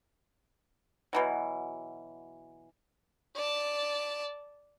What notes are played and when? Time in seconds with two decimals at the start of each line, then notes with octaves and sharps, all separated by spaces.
1.13 B2 E3 F#3
3.36 D5 A5